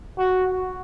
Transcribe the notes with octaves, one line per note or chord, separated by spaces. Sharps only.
F#4